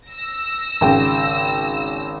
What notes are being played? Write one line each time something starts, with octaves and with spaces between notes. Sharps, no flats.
E6 A#6
G#1 C#3 G5